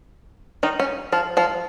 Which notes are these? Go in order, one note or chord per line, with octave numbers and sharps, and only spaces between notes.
D#3 D#4
C#4
F3 F4
F3 F4